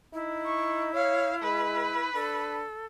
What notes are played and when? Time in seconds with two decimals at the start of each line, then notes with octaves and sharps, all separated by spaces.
0.14 D#4 E4
0.45 C#6
0.94 C#5 F5
1.43 G#3 B4
2.15 D4 A4